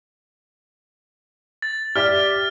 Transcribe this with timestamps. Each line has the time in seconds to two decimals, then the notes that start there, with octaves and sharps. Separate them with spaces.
1.62 A6
1.96 G4 D5 E5 F6